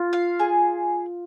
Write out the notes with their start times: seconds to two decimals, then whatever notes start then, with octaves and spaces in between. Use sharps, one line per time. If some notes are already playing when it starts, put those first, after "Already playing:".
Already playing: F4
0.13 F5
0.39 G#4